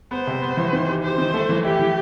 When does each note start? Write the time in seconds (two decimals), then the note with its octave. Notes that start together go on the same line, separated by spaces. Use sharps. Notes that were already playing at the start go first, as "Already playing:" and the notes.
0.11 B3 C5
0.27 C3
0.42 B3
0.57 E3
0.73 D#3
0.88 G4
1.03 G4 C5
1.18 D#3
1.34 A3
1.49 E3
1.64 E4 G4
1.79 E3